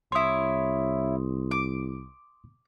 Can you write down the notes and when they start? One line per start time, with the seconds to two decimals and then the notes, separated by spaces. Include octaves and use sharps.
0.12 C2 E4 C#5 C6 D#6
1.51 D6